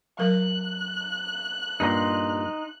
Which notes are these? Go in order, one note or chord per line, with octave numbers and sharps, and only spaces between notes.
F#3 A#4 F#6
G2 A#2 D#4 G4 A#5 C6